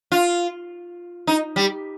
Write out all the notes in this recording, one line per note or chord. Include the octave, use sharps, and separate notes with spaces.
F4
D#4
G3